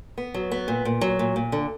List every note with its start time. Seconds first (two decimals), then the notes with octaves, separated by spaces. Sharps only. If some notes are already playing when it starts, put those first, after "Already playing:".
0.18 B3
0.34 F#3
0.51 B3
0.68 A#2
0.85 A#2
1.01 F#3
1.19 A#2
1.36 A#2
1.52 D3